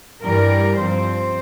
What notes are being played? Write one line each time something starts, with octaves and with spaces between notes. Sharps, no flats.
G2 E3 G3 A#4
G2 F3 C4 C5